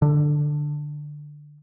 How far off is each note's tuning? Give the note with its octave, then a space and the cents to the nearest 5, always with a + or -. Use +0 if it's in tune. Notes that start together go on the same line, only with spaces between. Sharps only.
D3 +10